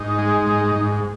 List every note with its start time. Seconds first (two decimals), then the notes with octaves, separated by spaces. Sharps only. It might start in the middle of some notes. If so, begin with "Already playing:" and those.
Already playing: G#2 D#4
0.18 G#3
0.47 G#2
0.76 G#2